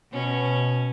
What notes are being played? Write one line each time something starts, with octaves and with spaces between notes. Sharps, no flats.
B2 C#4